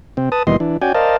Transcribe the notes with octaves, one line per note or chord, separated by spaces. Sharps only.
C3 C4
B4 A5 D#6
D#2 B2 E3 G3 D#5 C6
E3 D4
C#4 F#4 D5 G5 G#5
A#4 C5 D5 D#5 F5 A5